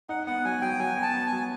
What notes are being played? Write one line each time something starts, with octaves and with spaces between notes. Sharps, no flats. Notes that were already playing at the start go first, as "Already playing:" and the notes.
D#4 F#5
B3 F#5
F#3 G#5
F#3 G5
F#3 G#5
B3
A5
B3
G#5
F#3